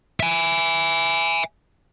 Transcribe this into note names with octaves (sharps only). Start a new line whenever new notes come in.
E5 G#5